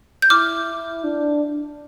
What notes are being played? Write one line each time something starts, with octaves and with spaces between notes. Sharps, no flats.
G6
E4 D6 F6
D4